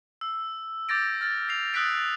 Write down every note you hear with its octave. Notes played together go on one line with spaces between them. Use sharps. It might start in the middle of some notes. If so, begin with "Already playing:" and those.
E6
D6 G6 A6 A#6 D7
F6 A6
A#6 C7 F7
D#6 E6 F#6 A6 B6 D7